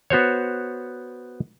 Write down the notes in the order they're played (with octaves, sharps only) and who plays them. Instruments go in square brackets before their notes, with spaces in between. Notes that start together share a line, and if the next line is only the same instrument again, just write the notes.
[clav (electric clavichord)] B3 F#4 C5 C#5